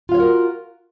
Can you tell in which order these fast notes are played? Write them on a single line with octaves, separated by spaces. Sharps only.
F4 F5 C#5 F#4 A#4